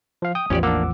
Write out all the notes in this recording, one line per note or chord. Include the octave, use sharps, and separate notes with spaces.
F3 F5
G5 D#6
A1 E2 F3 C#4 G4 D5
A#3 D4 F#5 D6 E6